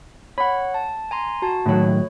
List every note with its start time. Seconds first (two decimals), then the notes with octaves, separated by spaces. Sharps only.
0.38 C#5 F#5 B5
0.74 A5
1.11 G#5 A#5 C6
1.42 F#4 A5
1.66 A2 D#3 F#3 A3 C#5